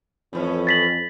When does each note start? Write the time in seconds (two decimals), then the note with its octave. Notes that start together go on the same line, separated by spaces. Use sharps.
0.33 F2 A2 E3 C#4
0.67 A6 B6 F#7